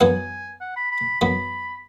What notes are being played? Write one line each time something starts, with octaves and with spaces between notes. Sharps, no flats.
F#2 E3 B3 E4 G#5
F#5
B5
B5
F#2 E3 B3 B5